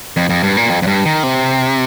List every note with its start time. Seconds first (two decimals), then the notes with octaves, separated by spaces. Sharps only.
0.17 F2
0.30 F2
0.43 G2
0.57 A#2
0.70 F2
0.82 F2
0.87 G2
1.05 D#3
1.23 C3